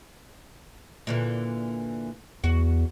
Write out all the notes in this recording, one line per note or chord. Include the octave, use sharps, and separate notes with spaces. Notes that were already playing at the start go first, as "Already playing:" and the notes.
A#2 D3 E3
E2 F#4